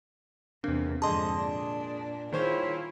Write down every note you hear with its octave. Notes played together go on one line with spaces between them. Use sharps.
E2 C3 A#3 D4
F2 G#2 D3 G#4 D#5 A5 C6
A#2 D4
D#3 E4 F4 G#4 C5 C#5